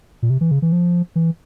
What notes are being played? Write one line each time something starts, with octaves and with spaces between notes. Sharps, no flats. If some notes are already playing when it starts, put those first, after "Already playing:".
A#2
C3
E3
C#3
E3
F3
E3